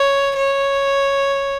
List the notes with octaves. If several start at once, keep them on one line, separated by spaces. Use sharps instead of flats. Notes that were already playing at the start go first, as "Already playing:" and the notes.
Already playing: C#5
C#5